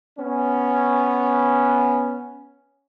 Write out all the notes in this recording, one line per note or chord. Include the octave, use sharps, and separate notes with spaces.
B3 C#4